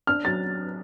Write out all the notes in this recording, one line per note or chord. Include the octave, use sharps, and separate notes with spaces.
D4 F6
F#3 A6